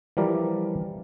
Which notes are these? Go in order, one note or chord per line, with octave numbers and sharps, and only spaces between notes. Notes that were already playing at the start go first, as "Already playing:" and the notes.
E3 F3 G3 A#4 D5